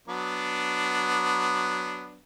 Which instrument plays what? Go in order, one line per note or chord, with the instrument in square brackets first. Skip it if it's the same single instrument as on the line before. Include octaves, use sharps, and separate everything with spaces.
[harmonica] F#3 B3 D4